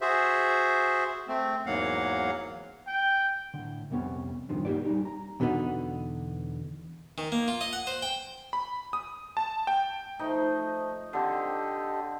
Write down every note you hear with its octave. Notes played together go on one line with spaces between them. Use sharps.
F#4 G#4 C5 E5
A3 C4
E2 G#2 F#3 A#3 F5 F#5
G5
A2 D3
C2 F2 C3 B3 C#4
C2 G2 D#3 F3 D4
A#3 D#4 G4 B4 D5
G3 C#4 D#4 G4
A#5
E2 B2 D3 A3 B3 D#4
D#3
A#3
F4
D#5
F#5
C5
G5
B5
D#6
A5
G5
F3 A3 D#4 D#5
D3 C4 G4 A4 D#5